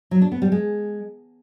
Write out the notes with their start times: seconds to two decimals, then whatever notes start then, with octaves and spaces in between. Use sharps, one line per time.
0.11 F#3
0.21 D4
0.32 B3
0.42 G3
0.52 G#3